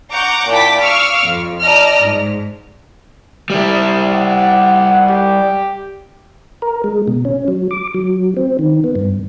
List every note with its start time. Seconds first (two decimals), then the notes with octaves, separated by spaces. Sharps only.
0.12 F#5 A#5 C#6 D6 G6
0.50 A#2 E4 G5 A5 D6 B6
0.82 F5 C#6 D6 E6 F6
1.25 F2
1.62 D5 D#5 A5 A#5 F6
2.01 G#2
3.50 G3 E4
4.15 F#5
5.08 G4
6.62 A#4
6.84 G#3
7.08 B2
7.25 C#4
7.48 F#3
7.71 D6
7.94 F#3
8.37 C4
8.59 D#3
8.84 B3
8.95 G2